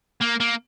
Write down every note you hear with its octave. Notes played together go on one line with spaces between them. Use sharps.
A#3
A#3